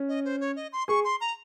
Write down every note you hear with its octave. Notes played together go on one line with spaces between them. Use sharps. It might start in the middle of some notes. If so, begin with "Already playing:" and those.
Already playing: C#4
D#5
C5
C#5
D#5
C6
G#4 C#6
C6
A#5